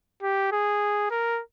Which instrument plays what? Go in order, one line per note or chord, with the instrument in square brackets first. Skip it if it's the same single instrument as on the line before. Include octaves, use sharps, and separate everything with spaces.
[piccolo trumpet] G4
G#4
A#4